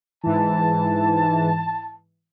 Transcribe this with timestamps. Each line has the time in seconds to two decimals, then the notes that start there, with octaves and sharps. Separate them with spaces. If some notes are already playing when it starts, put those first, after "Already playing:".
0.23 G#2 E3 A5